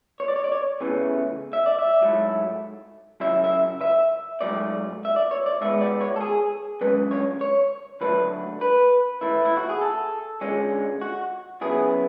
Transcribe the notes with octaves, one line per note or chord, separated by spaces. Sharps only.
C#5
D5
C#5
D5
C#5
E2 C#3 E3 A3 C#4
E5
D5
E5
G#2 F#3 A3 E4
F#2 C#3 F#3 C#4 E4 E5
E5
E5
G#2 F#3 A3 D5
E5
D5
C#5
D5
G#2 G#3 B3 E5
D5
C#5
A4
G#4
F#2 D3 G#3 C#4 B4
C#5
C#5
D3 F#3 A3 D4 B4
B4
A2 E3 A3 E4
E4
F#4
G#4
A4
D3 G#3 C#4
F#4
C#3 F#3 B3 E4 G#4